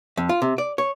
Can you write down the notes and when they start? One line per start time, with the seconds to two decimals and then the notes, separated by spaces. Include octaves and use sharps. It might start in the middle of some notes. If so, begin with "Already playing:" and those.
0.17 F2
0.29 F4
0.42 C3
0.58 D5
0.78 C#5